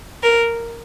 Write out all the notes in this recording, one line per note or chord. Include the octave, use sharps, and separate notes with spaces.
A#4